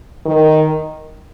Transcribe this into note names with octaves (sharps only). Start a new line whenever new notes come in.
D#3